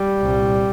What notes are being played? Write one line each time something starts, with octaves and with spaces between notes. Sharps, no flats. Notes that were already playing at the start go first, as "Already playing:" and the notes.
Already playing: G3
C2 A#2